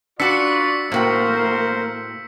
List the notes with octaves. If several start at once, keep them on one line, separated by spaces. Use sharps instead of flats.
D4 F4 F#4 B4 D5 E6 B6 C#7
A2 A#3 F#4 A#4 C5 G5